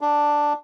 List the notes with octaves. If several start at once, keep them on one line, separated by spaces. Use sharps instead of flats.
D4